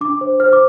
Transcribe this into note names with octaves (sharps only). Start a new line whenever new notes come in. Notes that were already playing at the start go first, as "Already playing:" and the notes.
D4 D6
C5
C5 F6
D6